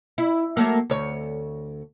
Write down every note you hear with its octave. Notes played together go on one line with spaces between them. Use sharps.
E4
F#3 A3 A#3
D2 C#5